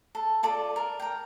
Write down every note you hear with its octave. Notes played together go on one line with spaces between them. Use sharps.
A4
F4 A4 D5 D6
A#4
A#4 G5